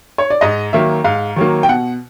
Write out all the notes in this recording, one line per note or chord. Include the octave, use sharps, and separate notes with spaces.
C#5
D5
G#2 D#5
D#3 F#3 A#3 E5
G#2 F5
D#3 F#3 A#3
G5
B2 F#5